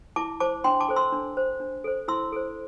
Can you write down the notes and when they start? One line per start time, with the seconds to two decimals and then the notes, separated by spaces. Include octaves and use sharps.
0.16 E4 A5 D6
0.40 C5 A5 D6
0.64 D4 G5 C6
0.80 A5 D6
0.89 A4 C5
0.96 C6 E6
1.12 D4
1.37 C5
1.60 D4
1.84 A4 C5
2.08 E4 C6 E6
2.32 A4 C5